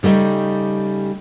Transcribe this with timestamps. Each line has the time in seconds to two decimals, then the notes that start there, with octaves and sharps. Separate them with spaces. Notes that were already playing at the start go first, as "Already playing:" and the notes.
0.03 C#3 G3 A3 D#4